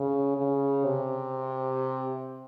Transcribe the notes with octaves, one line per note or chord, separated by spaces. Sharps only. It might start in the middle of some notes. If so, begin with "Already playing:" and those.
Already playing: C#3
C#3
C3